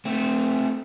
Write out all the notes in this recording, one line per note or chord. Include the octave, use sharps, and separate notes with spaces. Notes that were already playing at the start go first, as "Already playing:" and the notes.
A3 C4